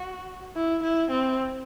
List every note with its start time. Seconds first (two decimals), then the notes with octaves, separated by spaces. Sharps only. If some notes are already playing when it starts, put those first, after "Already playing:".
Already playing: F#4
0.56 E4
0.83 E4
1.11 C4